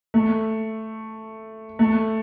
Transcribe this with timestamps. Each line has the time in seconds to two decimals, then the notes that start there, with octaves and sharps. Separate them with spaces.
0.14 A3
1.79 A3